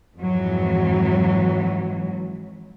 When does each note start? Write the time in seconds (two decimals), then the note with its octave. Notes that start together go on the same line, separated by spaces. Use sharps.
0.19 F2 G#2 E3 F#3